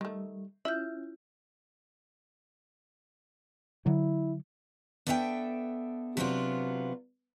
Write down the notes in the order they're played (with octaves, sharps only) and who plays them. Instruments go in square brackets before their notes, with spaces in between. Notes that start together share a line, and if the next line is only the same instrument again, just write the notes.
[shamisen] D#3 A3 [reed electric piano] G3
[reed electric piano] C#4 [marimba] E4 F4 G6 [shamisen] E5
[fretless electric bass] D3 F#3 [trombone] E4
[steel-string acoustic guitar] B3 D4 A4 E5 F5 G5
C3 F#3 B3 C4 D4 F4